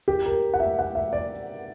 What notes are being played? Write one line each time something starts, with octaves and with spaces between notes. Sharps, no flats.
G4
A#4
F#5
E5
F#5
E5
D5